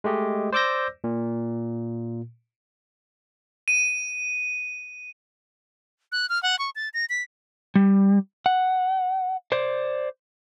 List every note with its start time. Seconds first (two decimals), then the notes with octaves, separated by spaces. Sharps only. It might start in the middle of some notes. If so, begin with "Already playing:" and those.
0.04 G#3 A3 G4 D#5
0.53 C5 D5 D6 E6 G6 A#6
1.04 A#2
3.68 D#7
6.12 F#6
6.29 F6
6.43 F#5
6.59 C#6
6.76 A6
6.94 A#6
7.09 B6
7.75 G3
8.46 F#5
9.52 C5 D5